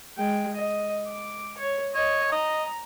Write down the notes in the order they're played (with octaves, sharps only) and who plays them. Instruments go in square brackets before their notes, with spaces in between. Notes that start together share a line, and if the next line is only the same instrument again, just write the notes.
[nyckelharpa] G#3 G5
D#5
D6
C#5
[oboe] C#5 [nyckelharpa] D#5
[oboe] D#5 [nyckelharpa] A#5